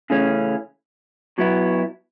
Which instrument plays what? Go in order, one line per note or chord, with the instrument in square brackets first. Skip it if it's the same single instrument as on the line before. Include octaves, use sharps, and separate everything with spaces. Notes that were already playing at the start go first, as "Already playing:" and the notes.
[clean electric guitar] C#3 E3 A3 C#4
B2 F#3 B3 E4